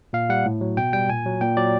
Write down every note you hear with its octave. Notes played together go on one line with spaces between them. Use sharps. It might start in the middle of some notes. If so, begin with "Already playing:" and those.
A#2 F5
G3 F#5
A2
F#3
B2 G5
G3 G5
A#2 G#5
F#3
A#2 G5
F#3 D5